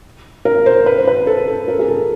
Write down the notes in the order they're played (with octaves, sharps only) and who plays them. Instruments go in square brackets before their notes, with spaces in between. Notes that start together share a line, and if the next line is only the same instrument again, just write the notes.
[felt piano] A#4
C5
B4
C5
B4
A4
A4
A#4
G#4
A4